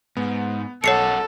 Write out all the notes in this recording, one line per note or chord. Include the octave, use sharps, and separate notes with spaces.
G#2 B3
B1 A4 A#4 C#5 F#5 C7 C#7